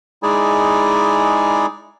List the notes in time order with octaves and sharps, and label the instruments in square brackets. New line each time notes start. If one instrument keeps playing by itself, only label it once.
[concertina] G#3 D#4 E4 G#4 D5 G#5